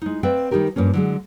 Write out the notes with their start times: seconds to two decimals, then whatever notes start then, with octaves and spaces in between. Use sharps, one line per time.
0.02 G#3 D#4
0.23 C4 B4 D5 E5 F5 G5
0.51 D#3 G3 D#4 G4 A#4
0.76 G2 F3 A#3 C#4
0.94 D3 F#3 G#3